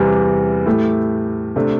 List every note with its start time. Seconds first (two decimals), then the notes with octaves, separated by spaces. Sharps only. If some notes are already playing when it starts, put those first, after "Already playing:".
Already playing: E2 C3 E3 G3
0.66 A2 A3 E4 G4
1.56 C3 A3 D4